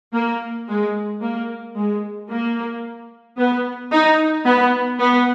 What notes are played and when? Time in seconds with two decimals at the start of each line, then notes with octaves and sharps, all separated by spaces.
0.14 A#3
0.68 G#3
1.22 A#3
1.76 G#3
2.30 A#3
3.38 B3
3.91 D#4
4.45 B3
4.99 B3